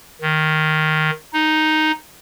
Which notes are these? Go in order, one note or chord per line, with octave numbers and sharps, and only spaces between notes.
D#3
D#4